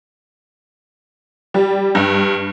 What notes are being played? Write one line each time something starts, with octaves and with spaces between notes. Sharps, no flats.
G3
G2